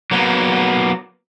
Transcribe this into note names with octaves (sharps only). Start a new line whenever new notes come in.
F#3 A#3 B3